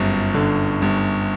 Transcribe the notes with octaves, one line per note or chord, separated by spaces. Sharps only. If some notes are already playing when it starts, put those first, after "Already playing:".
Already playing: G1 F#2
D3
G1